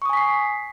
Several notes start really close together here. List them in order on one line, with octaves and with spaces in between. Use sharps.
C#6 D#6 G#5 B6 C7